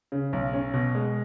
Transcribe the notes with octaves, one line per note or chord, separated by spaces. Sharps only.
C#3
B1
C#4
B2
G#3